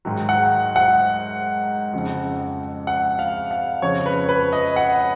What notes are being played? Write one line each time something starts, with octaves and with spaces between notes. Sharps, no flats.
G#2 D#3 F#3
F#5
F#5
F2 C#3 F3
F#5
F5
F5
F2 C#3 F3 C#5
B4
B4
D#5
F#5